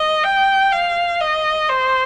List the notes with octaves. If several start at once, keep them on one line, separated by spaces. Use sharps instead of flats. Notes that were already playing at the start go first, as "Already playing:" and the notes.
Already playing: D#5
G5
F5
D#5
C5